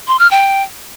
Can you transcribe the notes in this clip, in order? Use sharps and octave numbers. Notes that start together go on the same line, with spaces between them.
C6
F6
G5